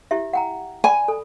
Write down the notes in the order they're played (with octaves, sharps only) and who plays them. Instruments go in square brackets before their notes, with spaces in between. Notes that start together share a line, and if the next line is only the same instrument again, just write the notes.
[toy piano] E4 G4 E5
F#5 G5 A#5
[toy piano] D5 B5 [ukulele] G#5
[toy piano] A4